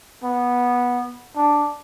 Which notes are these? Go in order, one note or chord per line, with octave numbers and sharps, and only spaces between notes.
B3
D4